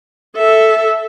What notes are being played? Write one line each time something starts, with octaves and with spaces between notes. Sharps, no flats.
A4 E5